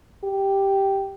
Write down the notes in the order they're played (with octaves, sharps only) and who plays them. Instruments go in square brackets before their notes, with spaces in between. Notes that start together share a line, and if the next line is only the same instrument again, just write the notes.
[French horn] G4